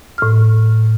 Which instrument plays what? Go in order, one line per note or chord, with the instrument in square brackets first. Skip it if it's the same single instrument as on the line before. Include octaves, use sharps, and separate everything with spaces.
[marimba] A2 F6